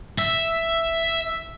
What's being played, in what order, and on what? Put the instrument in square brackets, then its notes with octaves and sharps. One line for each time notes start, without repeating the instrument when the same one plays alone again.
[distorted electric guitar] E5